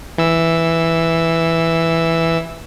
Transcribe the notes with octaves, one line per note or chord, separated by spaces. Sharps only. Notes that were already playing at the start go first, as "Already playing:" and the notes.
E3 E6